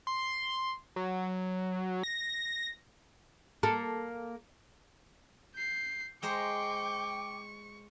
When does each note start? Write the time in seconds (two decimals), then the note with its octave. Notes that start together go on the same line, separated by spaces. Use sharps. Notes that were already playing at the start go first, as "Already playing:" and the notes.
0.07 C6
0.96 F#3
2.03 A#6
3.63 A#3 A4
5.54 G6 C7
6.23 G#3 C5 G5 A#5 C#6 D6